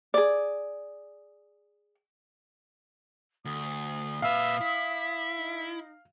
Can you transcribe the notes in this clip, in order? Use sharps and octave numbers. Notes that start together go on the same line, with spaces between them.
G#4 D5
D2 D#6
A#2 B4 E5 F5
E4 B6
D#4